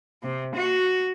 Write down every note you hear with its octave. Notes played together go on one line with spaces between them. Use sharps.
C3
F#4